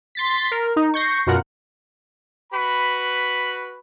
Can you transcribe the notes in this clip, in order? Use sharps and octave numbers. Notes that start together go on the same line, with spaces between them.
C6 A6 B6
A#4
D#4
C#6 G6 A#6 C7
F#2 B2 F4 A#4 F#5
F#4 B4 B5